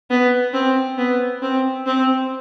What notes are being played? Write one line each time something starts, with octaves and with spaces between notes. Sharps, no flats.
B3
C4
B3
C4
C4